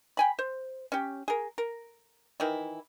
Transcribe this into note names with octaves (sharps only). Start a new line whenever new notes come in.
G5 G#5 B5
C5
C#4 G4
G#4 A#4
A#4
D#3 E3 E4